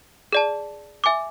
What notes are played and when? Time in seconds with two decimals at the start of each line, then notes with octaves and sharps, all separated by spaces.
0.33 G#4 D5 A5
1.04 E5 G#5 D6